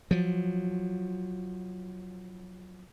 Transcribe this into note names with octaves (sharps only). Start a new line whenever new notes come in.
F3 F#3